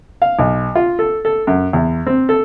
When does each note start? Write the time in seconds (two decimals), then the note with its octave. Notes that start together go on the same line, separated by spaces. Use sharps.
0.22 F5
0.39 B1
0.75 F4
0.99 A4
1.25 A4
1.47 F#2
1.73 E2
2.06 C4
2.29 A4